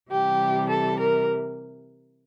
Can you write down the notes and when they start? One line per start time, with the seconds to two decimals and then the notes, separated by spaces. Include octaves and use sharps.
0.11 C3 E3 G3 G4
0.70 A4
0.99 A#4